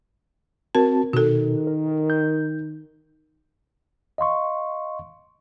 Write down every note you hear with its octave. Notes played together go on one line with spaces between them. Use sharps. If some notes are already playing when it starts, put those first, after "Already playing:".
C4 F#4 A#4 A5
B2 D#3 F#4 A4
A#4
G6
D#5 F5 C6 C#6